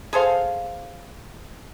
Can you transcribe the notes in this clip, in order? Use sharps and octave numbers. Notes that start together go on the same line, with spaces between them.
G#4 A4 C5 F5